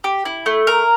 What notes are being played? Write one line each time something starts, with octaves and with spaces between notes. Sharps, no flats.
G4
E4
A3
A#4